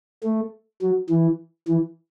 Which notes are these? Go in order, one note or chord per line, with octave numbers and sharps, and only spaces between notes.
A3
F#3
E3
E3